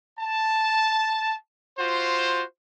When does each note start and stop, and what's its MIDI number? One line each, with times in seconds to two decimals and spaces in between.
0.19 1.34 81
1.79 2.43 65
1.79 2.43 66
1.79 2.43 72